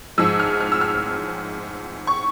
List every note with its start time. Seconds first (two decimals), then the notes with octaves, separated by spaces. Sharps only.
0.18 G#2 F3 G#3 E6
0.40 F6
0.60 F6
0.72 E6
0.81 F6
2.07 C#6